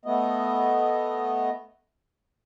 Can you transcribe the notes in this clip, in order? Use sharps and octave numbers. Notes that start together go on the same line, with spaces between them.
A3 B3 D#5